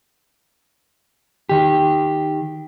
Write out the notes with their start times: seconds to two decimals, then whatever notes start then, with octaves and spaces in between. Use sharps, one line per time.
1.49 D#3 G4